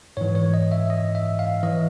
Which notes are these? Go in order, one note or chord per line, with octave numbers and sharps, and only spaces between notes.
G#2 E3 C#5
C#5
D#5
E5
D#5
E5
F5
E3 D#5